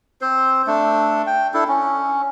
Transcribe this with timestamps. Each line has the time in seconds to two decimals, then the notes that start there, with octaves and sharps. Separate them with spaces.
0.21 C4 C5
0.67 A3 D4
1.27 G5
1.54 D4 E4 A4
1.68 C#4